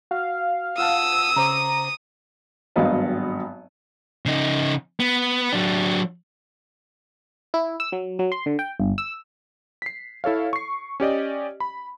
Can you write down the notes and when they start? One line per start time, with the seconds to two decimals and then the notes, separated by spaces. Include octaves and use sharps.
0.11 F#4 F5
0.78 F4 F#5 A5 D#6 E6
1.36 C#3 C5 A#5 D6
2.76 G#1 G2 F#3 B3 D#5 F5
4.26 C#3 D#4
5.00 B3
5.53 F#3 D4
7.54 E4
7.80 E6
7.92 F#3
8.19 F#3
8.32 C6
8.46 D3
8.59 G5
8.80 G1
8.98 E6
9.82 B6 C7
10.24 E4 A4 C#5 F5
10.53 C#6 C7
11.00 C#4 G4 D5 D#5
11.60 B5